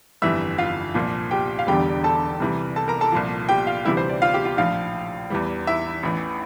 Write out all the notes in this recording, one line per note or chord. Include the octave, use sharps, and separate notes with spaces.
G1 F2 E3 G3 E5 E6
F4 F5
C2 A#2 F3
G4 G5
F5
E1 E2 D3 G3 G4 G5
A4 A5
C2 C3 E3 G3
A4 A5
A#4 A#5
A4 A5
C2 A#2 F3
G4 G5
F4 F5
D2 C3 E3 G3 E4 E5
C5
D5
F4 F5
G4 G5
F4 F5
A#1 A2 F3 F4 F5
E2 E3 G3
E4 E5
A1 A2 E3